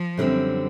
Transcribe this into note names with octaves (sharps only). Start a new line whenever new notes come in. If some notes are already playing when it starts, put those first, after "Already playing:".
Already playing: F3
F#2 D3 G3 C4